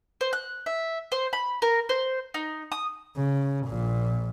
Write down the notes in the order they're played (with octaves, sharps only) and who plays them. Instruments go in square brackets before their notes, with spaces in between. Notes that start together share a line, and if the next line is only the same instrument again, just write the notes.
[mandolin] C5
F#6
E5
C5
B5
A#4
C5
D#4
D#6
[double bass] C#3
A#1 A#2